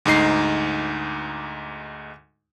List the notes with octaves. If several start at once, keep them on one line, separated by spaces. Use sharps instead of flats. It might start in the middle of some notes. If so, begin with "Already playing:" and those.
D2 G#2 D#4 C7